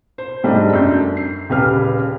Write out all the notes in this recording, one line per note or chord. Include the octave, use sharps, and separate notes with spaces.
C5
G#2 G3 A3 D4 D#4
F#2 D4 G6
C7
D#1 C#3 G4 B4 F6